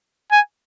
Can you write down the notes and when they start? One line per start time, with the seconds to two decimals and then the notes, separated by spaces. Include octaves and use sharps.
0.32 G#5